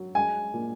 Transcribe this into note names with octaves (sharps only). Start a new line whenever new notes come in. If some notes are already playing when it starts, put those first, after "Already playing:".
Already playing: F#3
G#3 G#5
A#2